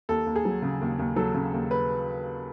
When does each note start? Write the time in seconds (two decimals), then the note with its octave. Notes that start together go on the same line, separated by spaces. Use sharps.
0.09 D#2 A4
0.27 D#2
0.36 G#4
0.45 F#3
0.62 C#3
0.81 D#2
0.99 D#2
1.16 F#3 A4
1.35 C#3
1.53 D#2
1.71 B4